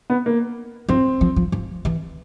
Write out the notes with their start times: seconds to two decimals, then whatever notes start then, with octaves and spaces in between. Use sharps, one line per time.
0.10 B3
0.26 A#3
0.89 F3 C4
1.21 F3
1.36 F3
1.52 F3
1.85 E3